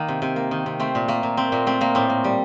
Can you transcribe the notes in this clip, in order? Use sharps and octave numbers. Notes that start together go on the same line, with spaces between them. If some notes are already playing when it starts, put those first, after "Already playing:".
Already playing: D#3 A#3
C3
C3
A#3
D#3
C3
A3 C4
A#2
A3 A#3
A#2
A3 C4
A#2 A#3
A3 C4
A#2 A#3
A2 C4
A#3
G3